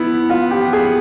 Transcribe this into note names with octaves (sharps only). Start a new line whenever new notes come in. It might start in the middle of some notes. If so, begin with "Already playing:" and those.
Already playing: B3 E4
F4
G4
G#4